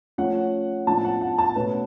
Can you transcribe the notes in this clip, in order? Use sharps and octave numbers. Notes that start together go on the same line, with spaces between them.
F3 A3 C#4 F#5
A2 F3 B3 D4 A5
F#5
F#5
A5
B2 A3 C#4 B4